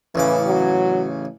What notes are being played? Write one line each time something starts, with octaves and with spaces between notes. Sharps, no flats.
A1 C#3 E3 D6
F#3